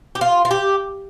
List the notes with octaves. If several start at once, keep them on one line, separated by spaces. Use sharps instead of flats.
G4
F4
F4
G4